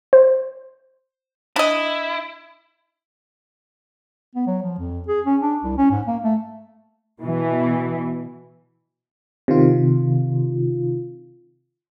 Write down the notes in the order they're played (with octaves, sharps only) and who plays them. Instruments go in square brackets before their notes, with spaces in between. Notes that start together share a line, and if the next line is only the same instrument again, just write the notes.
[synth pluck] C5
[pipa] D4 D#5 [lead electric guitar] E4
[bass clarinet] B3
F#3
F3
F2
G#4
C#4
D4
C2
C#4
G#2
A#3
A3
[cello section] B2 E3
[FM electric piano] C3 D#3 F4